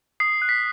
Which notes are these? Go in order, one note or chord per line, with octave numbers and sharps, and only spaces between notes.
D#6 C7
F#6
B6